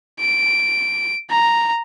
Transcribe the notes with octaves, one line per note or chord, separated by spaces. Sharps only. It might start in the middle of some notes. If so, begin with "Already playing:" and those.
D7
A#5